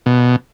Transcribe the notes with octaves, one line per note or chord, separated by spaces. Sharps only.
B2